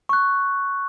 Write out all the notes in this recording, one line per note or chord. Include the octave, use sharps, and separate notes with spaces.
C#6 F#6